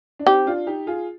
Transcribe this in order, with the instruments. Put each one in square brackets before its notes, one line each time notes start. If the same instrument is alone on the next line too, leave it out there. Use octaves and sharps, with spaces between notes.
[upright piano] D4
[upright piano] C4 D#4 [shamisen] G4
[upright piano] D4 F4
D#4 G4
F4 G#4